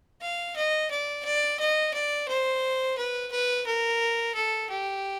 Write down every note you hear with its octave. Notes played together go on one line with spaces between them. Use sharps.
F5
D#5
D5
D5
D#5
D5
C5
B4
B4
A#4
A4
G4